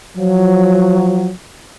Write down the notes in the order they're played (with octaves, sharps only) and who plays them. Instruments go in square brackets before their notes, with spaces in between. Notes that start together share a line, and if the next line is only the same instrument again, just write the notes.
[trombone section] F3 F#3